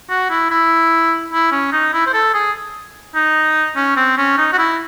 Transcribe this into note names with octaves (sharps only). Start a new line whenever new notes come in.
F#4
E4
E4
E4
C#4
D#4
E4
C5
A4
G#4
D#4
C#4
C4
C#4
D#4
F#4
E4